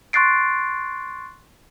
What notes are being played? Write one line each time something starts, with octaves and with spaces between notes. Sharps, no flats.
C6 C#6 F#6 A6 C7 D7